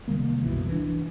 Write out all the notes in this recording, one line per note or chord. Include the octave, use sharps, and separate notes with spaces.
C3 D#3 G3 A#3
C2 F#2 B2 E3
E3 D4